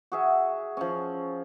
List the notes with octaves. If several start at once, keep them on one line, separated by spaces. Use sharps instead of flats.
F#4 G#4 E5
F3 C#4